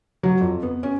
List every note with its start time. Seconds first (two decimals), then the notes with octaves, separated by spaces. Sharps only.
0.23 F#3
0.41 F2
0.63 B3
0.83 C#4